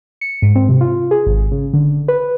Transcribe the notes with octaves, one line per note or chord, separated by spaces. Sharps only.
C#7
G#2
C4
C3
F4
G#4
G#1
C#3
D3
B4